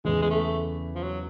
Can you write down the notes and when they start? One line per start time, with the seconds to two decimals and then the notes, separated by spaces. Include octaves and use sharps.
0.05 E2 C#3 E3 G#3
0.22 G#3
0.30 A3
0.95 F3
1.03 F#3